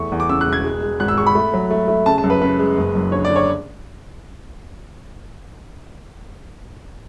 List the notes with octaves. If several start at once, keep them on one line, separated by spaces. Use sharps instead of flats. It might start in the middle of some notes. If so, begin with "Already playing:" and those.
Already playing: E2 A3 C#6
E2
D6
C#3 E6
F#6
E1
G#6
G#3
G#3
G#1 F#6
E6
G#3 C#6
B5
A3
F#3
A3
A3
C#3 A5
A5
F#2
B4
C#3 B4
G#3
F#1
F#2
D3 C#5
D5
D3
C#5